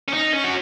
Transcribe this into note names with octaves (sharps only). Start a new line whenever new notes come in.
C#4
D#4
C#4
F#4